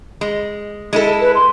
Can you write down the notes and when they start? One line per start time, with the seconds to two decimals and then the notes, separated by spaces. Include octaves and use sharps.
0.21 G#3
0.93 G#3 E4 A4
1.21 B4
1.35 C6